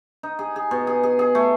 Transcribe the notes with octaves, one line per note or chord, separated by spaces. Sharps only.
D#4
G#4
G#4
B2
G#4
G#4
G#4
A3